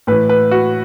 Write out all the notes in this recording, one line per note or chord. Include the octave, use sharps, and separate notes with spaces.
A2 E3 B4
B4
F#4